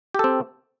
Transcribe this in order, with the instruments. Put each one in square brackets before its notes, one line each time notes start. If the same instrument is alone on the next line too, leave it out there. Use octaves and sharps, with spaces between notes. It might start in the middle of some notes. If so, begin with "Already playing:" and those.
[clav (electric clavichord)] G4
A4
C4